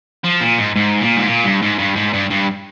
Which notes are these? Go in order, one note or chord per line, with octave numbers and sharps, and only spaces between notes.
F3
A#2
G#2
G#2
A#2
G#2
A#2
G2
G#2
G2
G#2
G2
G2